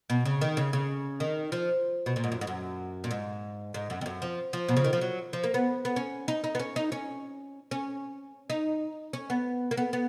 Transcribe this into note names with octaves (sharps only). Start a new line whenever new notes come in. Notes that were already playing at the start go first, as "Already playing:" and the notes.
B2
C#3
D#3
C#3
C#3
D#3
F3
B2
A#2
G#2
F#2
G#2
F#2
A#2
G#2
G#2
F#2
F2
F#2
F3
F3
B2
C#3
D#3
F3
F#3
F3
A#3
B3
B3
C#4
D#4
D#4
B3
C#4
D#4
C#4
C#4
D#4
C#4
B3
A#3
B3
B3